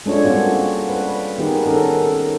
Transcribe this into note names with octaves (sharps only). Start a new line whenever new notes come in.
G#3 C#4 D4 F4 A4 C#5
G3 G#3 A#3 C4 F#4
B4
D#3 B3 D#4 G4 G#4 A#4
C#4 A4 A#4